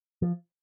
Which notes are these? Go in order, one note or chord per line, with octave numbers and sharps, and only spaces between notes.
F3